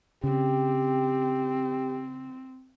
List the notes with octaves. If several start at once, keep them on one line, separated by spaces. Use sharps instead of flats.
C#3 C4 G4